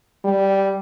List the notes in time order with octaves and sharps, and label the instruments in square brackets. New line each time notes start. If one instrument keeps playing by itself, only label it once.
[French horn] G3